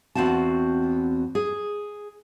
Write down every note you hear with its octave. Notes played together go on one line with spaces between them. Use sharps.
E2 C4 F#4 F5 A5
G#4